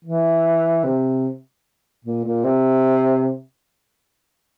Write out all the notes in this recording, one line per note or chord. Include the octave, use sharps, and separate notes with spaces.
E3
C3
A#2
A#2
C3